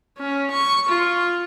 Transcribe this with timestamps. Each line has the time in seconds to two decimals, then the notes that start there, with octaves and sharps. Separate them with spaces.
0.18 C#4
0.51 C#6
0.88 F4